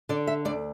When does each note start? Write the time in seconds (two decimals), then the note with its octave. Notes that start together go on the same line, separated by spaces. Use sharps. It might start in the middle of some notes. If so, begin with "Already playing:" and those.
0.09 D3 D5
0.27 E5
0.45 D2 D5